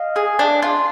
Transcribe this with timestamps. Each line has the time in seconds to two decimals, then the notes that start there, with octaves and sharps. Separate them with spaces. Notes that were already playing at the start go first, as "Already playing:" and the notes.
Already playing: D#5 F5
0.16 G#4
0.39 D4
0.62 F4